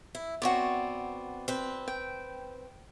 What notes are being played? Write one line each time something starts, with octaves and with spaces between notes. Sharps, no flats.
E4
B3 C4 F#4 C#5 D5
C4 B4
G5